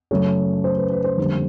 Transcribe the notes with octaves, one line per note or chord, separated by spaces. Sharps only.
F#2 C#3 F#3 A3 C#4 C#5
C5
B4
B4
C5
F2 D3 G3 A#3